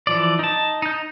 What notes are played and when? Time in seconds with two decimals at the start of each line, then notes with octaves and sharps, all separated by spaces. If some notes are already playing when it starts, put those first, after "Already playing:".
0.07 E3 F3 D5
0.39 D#4 A5
0.82 D#4 G6